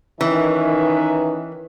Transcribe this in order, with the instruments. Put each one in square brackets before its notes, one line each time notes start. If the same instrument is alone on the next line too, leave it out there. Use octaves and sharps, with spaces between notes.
[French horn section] D#3 [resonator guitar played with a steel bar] E3 [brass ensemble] C#4 B4 E5